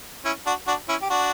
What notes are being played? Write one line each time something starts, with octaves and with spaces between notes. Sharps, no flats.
C#4 E4
D4 F#4
D4 F#4
C#4 E4
G4
D4 F#4